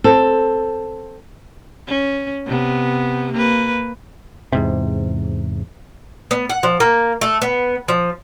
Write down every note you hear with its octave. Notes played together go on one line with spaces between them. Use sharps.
C4 A4
C#4
C3 B3
A#3 B4
E2 G#2 C3
B3
F#5
F3
A#3
A3
B3
F3